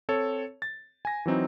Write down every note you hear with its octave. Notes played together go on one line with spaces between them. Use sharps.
C4 A4 C#5
A6
G#5 A#6
E3 F#3 C4 D#4